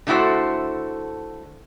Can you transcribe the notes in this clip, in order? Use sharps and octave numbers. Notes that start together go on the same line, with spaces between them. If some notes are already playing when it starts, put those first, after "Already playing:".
D3 A3 E4 F#4 C5